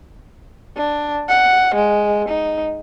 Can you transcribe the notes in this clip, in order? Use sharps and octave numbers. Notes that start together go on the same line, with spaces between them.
D4
F#5
G#3
D#4